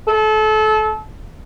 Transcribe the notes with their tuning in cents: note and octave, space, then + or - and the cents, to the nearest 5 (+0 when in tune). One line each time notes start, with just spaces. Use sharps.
A4 -30